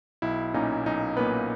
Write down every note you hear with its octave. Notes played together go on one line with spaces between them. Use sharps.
B1 E4
A#2 A#3 C#4 D#4
B1 D#4
A#2 A#3 B3 C#4 B4